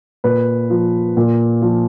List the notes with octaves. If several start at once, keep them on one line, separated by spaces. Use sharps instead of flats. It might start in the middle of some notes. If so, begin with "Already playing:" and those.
A#2 B4
F3
A#2
F3